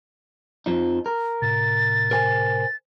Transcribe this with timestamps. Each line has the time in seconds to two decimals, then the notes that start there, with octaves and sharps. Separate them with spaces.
0.66 F2 F3 D#4
1.06 A#4
1.42 A2 C3 A6
2.11 A#4 C5 G#5